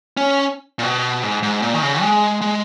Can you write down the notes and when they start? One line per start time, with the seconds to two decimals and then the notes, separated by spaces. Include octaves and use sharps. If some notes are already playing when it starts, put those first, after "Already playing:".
0.17 C#4
0.79 A#2
0.83 B2
1.23 G#2
1.43 G#2
1.62 A#2
1.74 D#3
1.83 C#3
2.02 G#3
2.41 G#3